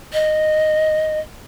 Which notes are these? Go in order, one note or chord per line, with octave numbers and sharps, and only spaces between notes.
D#5